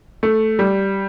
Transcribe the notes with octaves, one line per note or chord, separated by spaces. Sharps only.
A3
G3